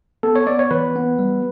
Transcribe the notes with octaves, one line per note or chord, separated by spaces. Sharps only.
B3 A4
C#5
B3 D5
C#5
E3 B4
B3
G3